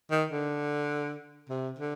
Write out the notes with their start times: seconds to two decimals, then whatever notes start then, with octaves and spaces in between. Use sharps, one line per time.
0.11 D#3
0.31 D3
1.49 C3
1.78 D3